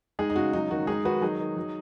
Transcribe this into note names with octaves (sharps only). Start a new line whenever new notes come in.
G#3 D#4 G#4
D#4
C#3 F#4
F#3 D#4
D#3 F#4
G#3 D#4 G#4
D#3 F#4 B4
F#3 D#4 G#4
D#3
F#3